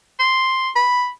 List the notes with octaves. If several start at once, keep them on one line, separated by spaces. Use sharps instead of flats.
C6
B5